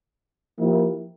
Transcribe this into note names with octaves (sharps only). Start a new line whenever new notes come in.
F3 A#3 E4 G4 A#4